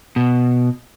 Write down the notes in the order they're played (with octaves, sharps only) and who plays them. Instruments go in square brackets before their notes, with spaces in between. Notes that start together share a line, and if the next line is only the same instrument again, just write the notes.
[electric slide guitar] B2